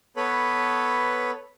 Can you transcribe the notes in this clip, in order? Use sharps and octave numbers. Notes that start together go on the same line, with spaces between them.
B3 A4 B4 C#5 B5